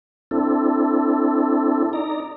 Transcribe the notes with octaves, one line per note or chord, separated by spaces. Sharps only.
C4 D4 E4 A4
D#4 D5 A#5